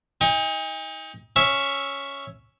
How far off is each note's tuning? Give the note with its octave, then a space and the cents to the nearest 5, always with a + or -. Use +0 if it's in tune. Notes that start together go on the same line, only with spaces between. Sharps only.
D#4 +30 G#5 -45
C#4 +0 E5 +0